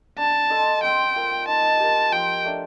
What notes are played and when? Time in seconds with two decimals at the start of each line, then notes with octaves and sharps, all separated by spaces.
0.18 D4 A5
0.50 A4 C5 D#5
0.83 C4 G5
1.16 F4 A#4
1.47 D#4 A5
1.80 G4 A#4
2.12 F3 G5
2.45 A3 D4